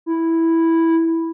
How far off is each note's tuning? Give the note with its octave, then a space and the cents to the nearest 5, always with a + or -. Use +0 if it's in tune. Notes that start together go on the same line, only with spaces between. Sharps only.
E4 -5